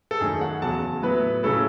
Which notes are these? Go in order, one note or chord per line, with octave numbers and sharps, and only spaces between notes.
A4
F#2 D#3 A3 C#4 G#4
F#5
E2 C#3 F#3 A5
A2 F#3 B3 E4 B4
C#3 F#3 A3 C#4 E4 A4